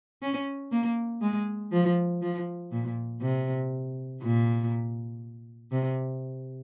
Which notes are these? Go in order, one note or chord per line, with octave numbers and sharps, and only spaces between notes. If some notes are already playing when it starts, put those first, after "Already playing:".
C#4
A#3
G#3
F3
F3
A#2
C3
A#2
C3